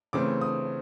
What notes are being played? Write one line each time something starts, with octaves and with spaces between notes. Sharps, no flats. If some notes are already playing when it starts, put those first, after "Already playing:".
C#3 E3 A3 C4 D6
D#6